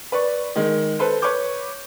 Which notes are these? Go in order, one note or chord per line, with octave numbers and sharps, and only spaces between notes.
B4 D5 C#6
D#3 G#3
A4 B4 C5
B4 C#5 C#6 D6 G6